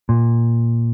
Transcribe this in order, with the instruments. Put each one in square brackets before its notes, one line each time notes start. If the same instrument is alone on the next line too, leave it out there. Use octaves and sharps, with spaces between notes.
[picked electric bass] A#2